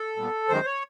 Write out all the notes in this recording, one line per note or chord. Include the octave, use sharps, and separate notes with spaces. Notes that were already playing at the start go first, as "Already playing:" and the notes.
Already playing: A4
A#2 G3 B3
F#2 D#3 G#3 C5
C#5